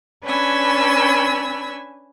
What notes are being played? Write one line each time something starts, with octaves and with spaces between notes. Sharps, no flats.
C#4 D4 B4 G#5 B5 E6